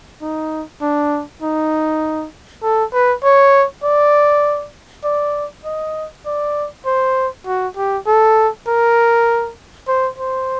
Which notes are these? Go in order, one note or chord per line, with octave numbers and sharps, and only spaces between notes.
D#4
D4
D#4
A4
B4
C#5
D5
D5
D#5
D5
C5
F#4
G4
A4
A#4
C5
C5